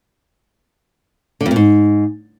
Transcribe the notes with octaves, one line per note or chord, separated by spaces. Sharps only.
D3
F2
A#2
G#2